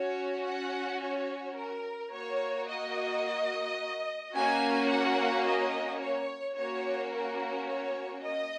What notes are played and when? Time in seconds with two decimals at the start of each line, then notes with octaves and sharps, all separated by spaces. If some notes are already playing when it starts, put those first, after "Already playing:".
Already playing: C#4 F#4 C#5
0.46 F#5
1.02 C#5
1.57 A#4
2.12 A#3 F#4 C#5
2.68 D#5
4.34 A#3 C#4 F#4 G#5
4.90 F#5
5.45 D#5
6.00 C#5
6.55 A#3 C#4 F#4 C#5
7.11 A#4
7.66 C#5
8.22 D#5